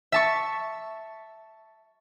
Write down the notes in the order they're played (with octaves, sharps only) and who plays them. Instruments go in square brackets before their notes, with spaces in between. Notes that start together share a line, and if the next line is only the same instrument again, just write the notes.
[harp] E5 A5 C#6